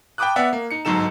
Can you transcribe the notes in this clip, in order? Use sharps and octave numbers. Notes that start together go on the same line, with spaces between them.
G5 A5 B5 D6 D#6 F#6
B3 D5 E5 F#5
A#3
D#4 C#7
G1 G#2 F#3 D#4 A4 E7